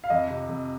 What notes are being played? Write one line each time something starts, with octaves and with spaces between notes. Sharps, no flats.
F5
F2 D#5
C3
F2